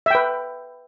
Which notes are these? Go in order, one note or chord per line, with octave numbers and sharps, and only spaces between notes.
B4 E5 G5